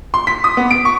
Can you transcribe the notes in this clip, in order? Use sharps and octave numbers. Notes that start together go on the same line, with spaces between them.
C6
B6
D#6
B3
D7
C#6